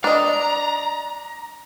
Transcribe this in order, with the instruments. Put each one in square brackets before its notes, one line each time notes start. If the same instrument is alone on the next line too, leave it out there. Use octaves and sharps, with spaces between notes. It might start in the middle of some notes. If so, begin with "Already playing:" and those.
[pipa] G3 D#5 [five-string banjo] D4 [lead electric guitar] A#5